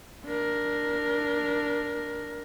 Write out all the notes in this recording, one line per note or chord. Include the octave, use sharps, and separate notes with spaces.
D4 A#4